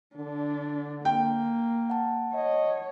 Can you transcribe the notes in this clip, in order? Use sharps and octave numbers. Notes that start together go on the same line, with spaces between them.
D3 D4
A#3 G5
F#5 A5
C#5 D#5